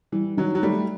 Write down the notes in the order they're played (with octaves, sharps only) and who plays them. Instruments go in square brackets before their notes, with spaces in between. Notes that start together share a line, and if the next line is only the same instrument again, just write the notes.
[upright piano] E3 [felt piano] G3
[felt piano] D#3 [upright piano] F#3
[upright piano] F#3
[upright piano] G3 [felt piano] A3